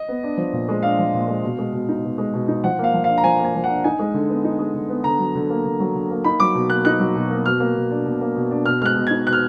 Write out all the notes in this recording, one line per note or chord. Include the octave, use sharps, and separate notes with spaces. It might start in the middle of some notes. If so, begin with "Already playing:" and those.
Already playing: D#5
B3
D4
F3
A#2
G#3
D4 F5
F3
A#2
G#3
B2
G#3
B2
D#4
B2
G#3
B2
D#4
F3 F#5
A#3 F5
F3
D4 F5
A#5
F3 G#5
A#3
G#5
F3
F#5
D4
D#4 G#5
G#3
D3
B3
D#4
G#3
D3
B3
D3 A#5
F#3
D3
A#3
D3
F#3
D3
A#3
D#4 B5
F#3 D6
B2
A#3 F#6
D#4 F#6
F#3
B2
A#3
B2 F6
A#3
B2
D4
B2
A#3
B2
D4
B2 F6
G#3 F6 F#6
B2
D#4 G#6
B2 F#6
F6